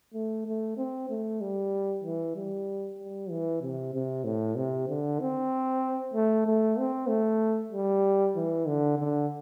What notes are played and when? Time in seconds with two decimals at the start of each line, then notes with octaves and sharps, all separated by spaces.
0.14 A3
0.46 A3
0.77 C4
1.10 A3
1.41 G3
2.03 E3
2.36 G3
2.99 G3
3.30 E3
3.62 C3
3.94 C3
4.24 A2
4.56 C3
4.88 D3
5.20 C4
6.14 A3
6.46 A3
6.78 C4
7.09 A3
7.72 G3
8.36 E3
8.66 D3
8.99 D3